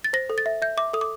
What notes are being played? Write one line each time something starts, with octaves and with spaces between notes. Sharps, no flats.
A6
C5 A#6
A4
A6
E5
E5 G6
E5 D6
A4 D#6
D6